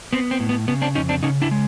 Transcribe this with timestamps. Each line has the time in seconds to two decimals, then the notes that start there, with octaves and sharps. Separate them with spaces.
0.13 B3 C4
0.31 C4
0.40 A2
0.49 B3
0.68 C#3 B3
0.82 C4 D4
0.95 F2 C#4 D#4
1.09 C4 D4
1.23 C#3 C#4 D#4
1.42 D4 E4
1.51 G#3